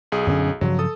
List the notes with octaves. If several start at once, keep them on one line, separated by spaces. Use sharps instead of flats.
B1 G#4
F#2 D3 C#4
G2 C#3 F3 F#3
A4 D#6